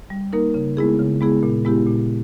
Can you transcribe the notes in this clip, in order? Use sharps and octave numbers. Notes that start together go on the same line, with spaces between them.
G3
A#3 D#4 A#4
C#3
G#3 B3 E4 G#4
C#3
G#3 B3 E4 G#4
A#2
G#3 B3 E4 G4
A#2